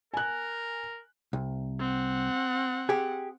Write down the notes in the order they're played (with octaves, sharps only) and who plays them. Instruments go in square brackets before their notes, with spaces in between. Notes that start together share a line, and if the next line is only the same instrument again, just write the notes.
[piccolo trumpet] A#4 [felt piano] G#5 F#6
[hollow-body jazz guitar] C2
[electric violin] C4 F#5
[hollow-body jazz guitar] G4 G#4